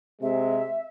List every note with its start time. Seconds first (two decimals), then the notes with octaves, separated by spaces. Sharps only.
0.22 C3 G#3 E5